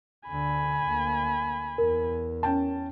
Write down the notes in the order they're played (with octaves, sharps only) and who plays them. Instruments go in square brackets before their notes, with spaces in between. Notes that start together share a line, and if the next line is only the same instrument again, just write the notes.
[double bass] D2 D3 [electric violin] G#5 B5
[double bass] D2 A#3
[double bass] E2 [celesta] A#4
[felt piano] C#4 G5 A5